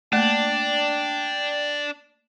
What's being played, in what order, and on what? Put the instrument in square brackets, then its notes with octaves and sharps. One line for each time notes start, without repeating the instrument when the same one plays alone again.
[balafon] A3 A#3 [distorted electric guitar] D4 [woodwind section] D5 G5